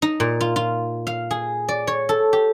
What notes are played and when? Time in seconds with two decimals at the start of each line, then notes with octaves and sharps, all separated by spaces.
0.02 D#4
0.20 A#2
0.41 F4
0.56 F4
1.07 F5
1.31 G#4
1.69 D5
1.87 C#5
2.09 A4
2.33 G4